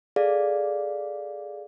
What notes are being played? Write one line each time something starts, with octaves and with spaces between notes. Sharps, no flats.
G#4 A4 D5 F5